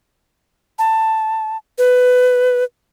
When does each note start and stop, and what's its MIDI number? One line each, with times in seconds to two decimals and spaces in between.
0.79 1.57 81
1.78 2.64 71